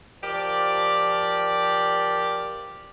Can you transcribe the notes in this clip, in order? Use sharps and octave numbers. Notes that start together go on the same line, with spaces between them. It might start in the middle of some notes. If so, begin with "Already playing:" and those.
F3 G4 A#4 D5